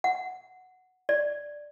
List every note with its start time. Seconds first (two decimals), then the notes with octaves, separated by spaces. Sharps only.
0.04 F#5
1.09 D5